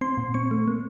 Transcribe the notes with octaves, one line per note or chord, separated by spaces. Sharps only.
C4 C6
A#2
C4 C#6
A3
A#3